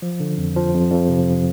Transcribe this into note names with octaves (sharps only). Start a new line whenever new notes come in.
F3
D3
F2
F3
F2
F2
C3